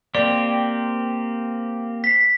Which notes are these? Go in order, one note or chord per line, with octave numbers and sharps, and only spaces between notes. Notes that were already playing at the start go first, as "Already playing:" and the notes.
A#3 C4 G4 D5
B6 C7